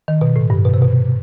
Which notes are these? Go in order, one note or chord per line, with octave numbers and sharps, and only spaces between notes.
D#3
B2
A2
G2
B2
C3
B2